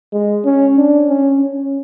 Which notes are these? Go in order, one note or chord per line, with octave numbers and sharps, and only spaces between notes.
G#3
C#4
D4
C#4
C#4